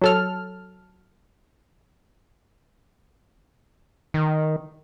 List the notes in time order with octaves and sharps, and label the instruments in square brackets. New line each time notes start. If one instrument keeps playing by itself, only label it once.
[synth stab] F#3 A4 F6
[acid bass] D#3